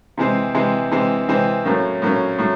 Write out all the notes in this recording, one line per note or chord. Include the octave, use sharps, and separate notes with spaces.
C3 E3 G#3 C4
C3 E3 G#3 C4
C3 E3 G#3 C4
C3 E3 G#3 C4
A2 F#3 A#3 C#4
A2 F#3 A#3 C#4
A2 F#3